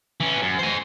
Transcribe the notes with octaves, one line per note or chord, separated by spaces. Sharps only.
E3 C#4
F#2
C5 G#5